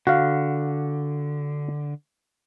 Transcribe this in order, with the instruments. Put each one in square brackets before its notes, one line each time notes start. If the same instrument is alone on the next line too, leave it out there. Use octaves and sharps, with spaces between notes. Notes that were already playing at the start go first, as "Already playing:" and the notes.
[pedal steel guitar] D3 [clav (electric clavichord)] F#4 F5